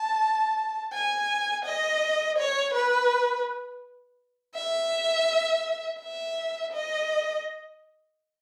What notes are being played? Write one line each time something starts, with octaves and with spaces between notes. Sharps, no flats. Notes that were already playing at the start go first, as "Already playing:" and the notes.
Already playing: A5
G#5
D#5
C#5
B4
E5
E5
D#5